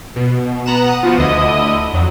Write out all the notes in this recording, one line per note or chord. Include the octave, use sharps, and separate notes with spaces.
B2
B3 A#5 F#6 E7
F#5 D#6
F3 B3 F4 F#4
D2 D3 E4 D#5 D#6
F2 F#3